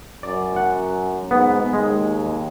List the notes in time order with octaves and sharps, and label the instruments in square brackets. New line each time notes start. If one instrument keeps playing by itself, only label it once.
[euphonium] F#2 [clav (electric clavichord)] D5
[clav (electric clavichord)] F#5
[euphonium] G#2 [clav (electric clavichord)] B3
[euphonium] D#2 [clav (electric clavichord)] G#3